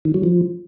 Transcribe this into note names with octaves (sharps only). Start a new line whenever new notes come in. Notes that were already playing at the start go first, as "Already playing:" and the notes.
D#3
F#3
F3